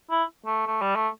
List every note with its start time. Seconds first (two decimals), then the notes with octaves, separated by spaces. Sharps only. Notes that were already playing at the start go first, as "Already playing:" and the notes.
0.11 E4
0.46 A3
0.67 A3
0.82 G3
0.95 A3